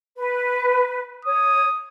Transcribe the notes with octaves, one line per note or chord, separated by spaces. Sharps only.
B4
C#5 D#6